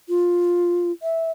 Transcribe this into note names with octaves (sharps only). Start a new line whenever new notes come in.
F4
E5